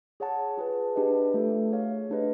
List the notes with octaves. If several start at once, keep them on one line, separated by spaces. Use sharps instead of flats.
G#4 C#5 F#5 A5
F4 G#4 B4
D4 G4 B4 D#5
A3 D4 F4 A4
G#4 C#5 F5
A3 D4 G4 B4 D#5